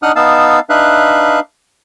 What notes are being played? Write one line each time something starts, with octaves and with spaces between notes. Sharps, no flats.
D4 D#4 F#5 D#6 F6 F#6
B3 D#4 F5 A5 E6
D4 D#4 B4 E5 F5 F#6